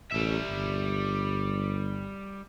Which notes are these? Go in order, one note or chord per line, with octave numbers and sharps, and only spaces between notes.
A1 G3 E5
G1